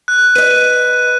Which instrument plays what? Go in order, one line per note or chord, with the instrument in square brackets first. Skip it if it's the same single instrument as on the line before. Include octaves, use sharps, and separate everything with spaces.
[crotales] F#6
[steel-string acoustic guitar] B4 D#5 [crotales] D#7
[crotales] D#7